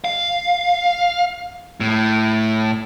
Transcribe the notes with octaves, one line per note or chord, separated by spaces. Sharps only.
F5
A2